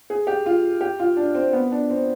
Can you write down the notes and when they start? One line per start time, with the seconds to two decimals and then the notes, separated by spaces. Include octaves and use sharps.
0.10 G#4
0.27 G4
0.46 F4
0.81 G4
0.99 F4
1.17 D4
1.35 C4
1.53 B3
1.72 D4
1.90 C4